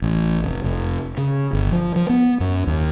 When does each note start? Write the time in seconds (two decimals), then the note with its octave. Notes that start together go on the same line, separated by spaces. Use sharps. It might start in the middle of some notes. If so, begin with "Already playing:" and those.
0.02 A1
0.44 F1
0.64 F1
1.17 C#3
1.53 G1
1.72 F3
1.96 F3
2.09 B3
2.40 F#2
2.67 D#2